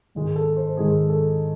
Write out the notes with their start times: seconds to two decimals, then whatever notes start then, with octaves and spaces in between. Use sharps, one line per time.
0.15 G#2 D#3 G#3
0.36 A4
0.57 C5
0.77 G#2 D#3 G#3 G#4
1.10 A4